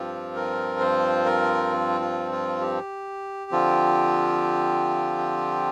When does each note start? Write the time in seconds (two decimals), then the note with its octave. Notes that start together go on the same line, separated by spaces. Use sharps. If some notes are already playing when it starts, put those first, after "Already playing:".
Already playing: G2 F3 C4 F4 G4
0.35 A#4
0.80 C5
1.25 A#4
2.01 F4
2.32 F4
2.61 G4
3.51 D3 F3 C4 F4